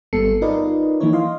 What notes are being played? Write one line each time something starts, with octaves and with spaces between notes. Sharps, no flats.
G#1 G3 B3 A4 C7 C#7
D#4 F4 A#4 B4 D5 D#5
E3 F3 A#3 D#4 E4 C#5
D#5 F5 C6